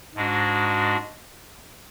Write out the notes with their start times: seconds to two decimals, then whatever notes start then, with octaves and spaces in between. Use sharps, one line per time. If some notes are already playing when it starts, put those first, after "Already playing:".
0.15 G#2 G#3 D4 F#4